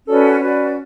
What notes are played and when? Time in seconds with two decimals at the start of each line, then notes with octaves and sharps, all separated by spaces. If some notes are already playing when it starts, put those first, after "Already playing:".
0.06 C#4 F#4 A4 B4 D5
0.40 C#4 F#4 B4 D5